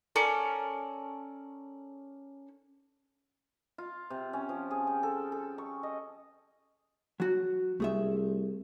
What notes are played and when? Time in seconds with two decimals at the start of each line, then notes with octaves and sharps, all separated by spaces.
0.16 C#4 A4 A#4 D5
3.78 F4
4.10 C3
4.33 C#4
4.49 F3
4.71 G#4
4.87 G5
5.03 A4
5.32 A4
5.58 C#6
5.83 D#5
7.20 F#3 F#4
7.80 C2 A3 G#4 E5